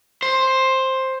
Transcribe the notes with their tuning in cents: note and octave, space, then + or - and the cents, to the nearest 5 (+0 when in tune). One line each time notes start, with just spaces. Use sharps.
C5 +10